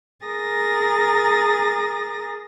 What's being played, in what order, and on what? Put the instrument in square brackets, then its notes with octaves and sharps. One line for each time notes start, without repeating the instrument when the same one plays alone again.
[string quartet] G#4 A#4 D#6 A6 A#6